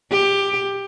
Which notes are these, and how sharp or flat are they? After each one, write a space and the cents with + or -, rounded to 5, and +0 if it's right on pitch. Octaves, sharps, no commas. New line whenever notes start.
G4 +15